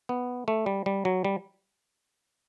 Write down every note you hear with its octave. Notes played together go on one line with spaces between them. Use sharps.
B3
A3
G3
G3
F#3
G3